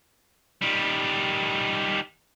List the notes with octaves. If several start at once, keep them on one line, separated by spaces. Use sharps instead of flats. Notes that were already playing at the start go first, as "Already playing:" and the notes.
D#3 G3